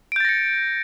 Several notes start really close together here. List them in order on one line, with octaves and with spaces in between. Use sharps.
D7 G6 A6 A#6 C#7